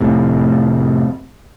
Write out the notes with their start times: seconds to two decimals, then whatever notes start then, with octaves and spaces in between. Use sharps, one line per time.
0.01 F1 A2 C3